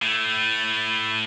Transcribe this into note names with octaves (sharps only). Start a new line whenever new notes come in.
A2 A3